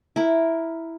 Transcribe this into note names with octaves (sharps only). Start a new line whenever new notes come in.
E4 A#4